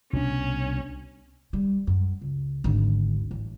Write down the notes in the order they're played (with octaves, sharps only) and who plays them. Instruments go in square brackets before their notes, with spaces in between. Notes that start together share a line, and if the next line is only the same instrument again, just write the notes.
[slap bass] C2 B2 D4 [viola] C#4
[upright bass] G3
F#2
C#2
G#1 D2
A1